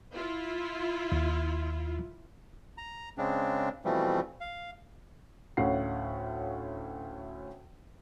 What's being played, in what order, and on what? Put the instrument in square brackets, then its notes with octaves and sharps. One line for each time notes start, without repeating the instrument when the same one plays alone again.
[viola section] E4 F4
[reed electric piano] D#2
[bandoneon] A#5
C#3 G#3 C4 D4
B2 E3 F3 G3 A3 C4
F5
[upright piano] D2 A2 C#4 F5 F#5 C7